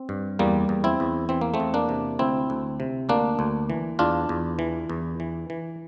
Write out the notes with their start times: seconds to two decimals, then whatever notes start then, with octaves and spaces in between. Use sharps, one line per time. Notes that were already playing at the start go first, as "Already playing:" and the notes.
Already playing: C4
0.09 G2
0.39 E2 G3 A#3
0.69 E2
0.84 C4 E4
1.00 E2
1.29 E3 C4
1.41 A#3
1.54 A3 C4
1.60 E2
1.74 A#3 D4
1.89 C3
2.19 D2 C4 E4
2.50 D2
2.80 C3
3.09 D2 A#3 D4
3.39 D2
3.70 E3
3.99 E2 D4 F4
4.29 E2
4.59 E3
4.90 E2
5.20 E3
5.50 E3